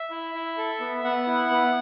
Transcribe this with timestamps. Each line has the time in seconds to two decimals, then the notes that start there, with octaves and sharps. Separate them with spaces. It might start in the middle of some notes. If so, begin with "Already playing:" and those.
Already playing: E5
0.11 E4
0.35 E4
0.58 A4
0.80 B3
1.04 B3 F#5
1.27 E4
1.50 B3